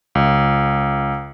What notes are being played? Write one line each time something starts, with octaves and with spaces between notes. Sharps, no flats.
C#2